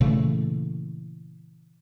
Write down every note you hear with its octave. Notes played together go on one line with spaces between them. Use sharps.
A#2 C#3 E3 A3